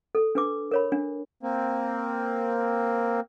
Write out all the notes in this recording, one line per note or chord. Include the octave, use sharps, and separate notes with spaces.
A4
D4 B4 D6
A#4 C#5 B5
D4
A#3 C4